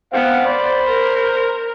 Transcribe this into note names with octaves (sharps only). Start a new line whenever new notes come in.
B3 C4 F5 F#5
C5 D5 B5
A#4